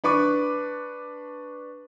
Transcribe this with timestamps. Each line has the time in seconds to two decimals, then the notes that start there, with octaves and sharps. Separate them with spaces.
0.04 D4 B4 C#6 D6